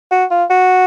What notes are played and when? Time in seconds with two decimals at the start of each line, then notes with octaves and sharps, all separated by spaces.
0.11 F#4
0.31 F4
0.50 F#4